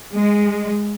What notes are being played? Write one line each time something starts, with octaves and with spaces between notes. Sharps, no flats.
G#3